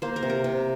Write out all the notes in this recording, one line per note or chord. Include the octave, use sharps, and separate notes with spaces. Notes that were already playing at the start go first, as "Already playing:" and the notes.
A#3 C5
A#4
C3
A#4
C3